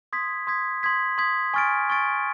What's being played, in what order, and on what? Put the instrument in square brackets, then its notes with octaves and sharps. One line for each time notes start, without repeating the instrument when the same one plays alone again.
[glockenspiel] C6 D#6 G#6 B6
C6 D#6 G#6 B6
C6 D#6 G#6 B6
C6 D#6 G#6 B6
G#5 C#6 F6 A6 D7
G#5 C#6 F6 A6 D7